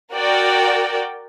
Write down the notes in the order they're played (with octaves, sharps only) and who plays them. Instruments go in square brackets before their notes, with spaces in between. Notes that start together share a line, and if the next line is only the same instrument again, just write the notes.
[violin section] F#4 A#4 D5 G5